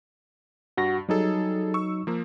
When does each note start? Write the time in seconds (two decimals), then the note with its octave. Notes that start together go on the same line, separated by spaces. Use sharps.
0.77 G2 F#4 A#6
1.09 F#3 G3 D#4 G#4 A4
1.74 C#6 E6
2.07 F3 A#3